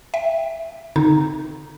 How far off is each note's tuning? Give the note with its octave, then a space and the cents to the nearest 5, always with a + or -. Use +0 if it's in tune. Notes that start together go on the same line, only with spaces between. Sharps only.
E5 +0 G5 +20
D3 +0 C4 -15 D#4 +0